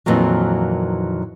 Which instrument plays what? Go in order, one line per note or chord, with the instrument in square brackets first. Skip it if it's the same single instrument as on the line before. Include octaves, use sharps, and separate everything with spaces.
[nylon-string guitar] F2 A#2 D#3 E3 F#3